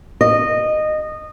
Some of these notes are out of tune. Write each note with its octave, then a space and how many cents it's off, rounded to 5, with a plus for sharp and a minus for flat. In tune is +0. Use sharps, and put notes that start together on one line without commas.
D#5 -15